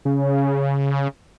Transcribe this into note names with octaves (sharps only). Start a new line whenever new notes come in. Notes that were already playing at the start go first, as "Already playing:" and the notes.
C#3